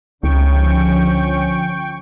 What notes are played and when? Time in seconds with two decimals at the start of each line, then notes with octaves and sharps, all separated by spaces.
0.23 C#2 D3 F3 C#4 G5 C#6